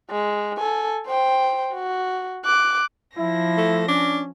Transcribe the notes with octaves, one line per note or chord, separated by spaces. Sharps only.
G#3
A4 G#5
C5 G5
F#4
D6 F#6
F3 E4 A#6
A3
C#4 D4